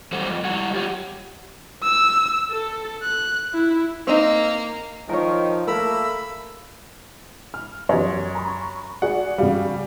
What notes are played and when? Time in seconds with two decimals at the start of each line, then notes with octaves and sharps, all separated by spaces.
0.12 F#3 G3 F#4 A4 C5
0.30 F2
0.45 G3 E4 F#4 F#5
0.74 F4 G4 C#5 F5 F#5
1.83 E6
2.52 A4
3.03 F#6
3.54 E4
4.07 A#3 C4 D#4
5.09 D#3 F3 A#4 C#5
5.68 A3 A#3 A#4 B5 E6
7.54 F6
7.89 F#2 F#3 G4 C#5
8.35 A#5 B5 C#6
9.02 F#4 G#4 D5 F#5
9.38 C#3 G3 F#4 F5